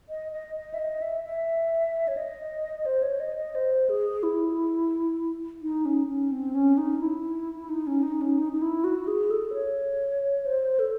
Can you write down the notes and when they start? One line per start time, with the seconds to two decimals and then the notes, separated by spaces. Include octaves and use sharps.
0.09 D#5
0.32 D#5
0.55 D#5
0.74 E5
0.79 D#5
1.02 E5
1.24 E5
2.08 C#5
2.17 D#5
2.86 C5
3.02 C#5
3.20 D#5
3.37 D#5
3.55 C5
3.89 G#4
4.23 E4
5.62 D#4
5.85 C#4
6.08 C#4
6.32 C4
6.55 C#4
6.78 D#4
6.99 E4
7.69 D#4
7.87 C#4
8.03 D#4
8.21 C#4
8.39 D#4
8.53 D#4
8.62 E4
8.84 F#4
9.07 G#4
9.31 A4
9.53 C#5
10.46 C5
10.79 A4